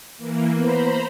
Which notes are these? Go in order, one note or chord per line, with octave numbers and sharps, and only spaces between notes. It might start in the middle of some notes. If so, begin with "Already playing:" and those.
E3 A#3
B3 C5 A#5 B5